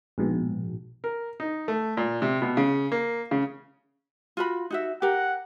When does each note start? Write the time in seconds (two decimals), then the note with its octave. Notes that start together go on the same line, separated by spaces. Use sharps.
0.18 A#1 G#2 B2
1.04 A#4
1.40 D#4
1.68 A3
1.97 A#2
2.22 C3
2.42 B2
2.57 C#3
2.92 A#3
3.31 C#3
4.37 F4 F#4 B5
4.70 D#4 F#4 E5
5.02 G4 A#4 F#5